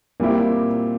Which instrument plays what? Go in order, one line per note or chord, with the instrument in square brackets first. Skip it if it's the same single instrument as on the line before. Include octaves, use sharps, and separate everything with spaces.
[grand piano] A#2 G3 C4 E4 G4